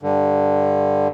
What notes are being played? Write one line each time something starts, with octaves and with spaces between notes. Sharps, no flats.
G2 D3